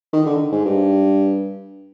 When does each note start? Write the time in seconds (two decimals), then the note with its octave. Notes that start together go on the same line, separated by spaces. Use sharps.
0.13 D#3
0.26 D3
0.52 G#2
0.65 G2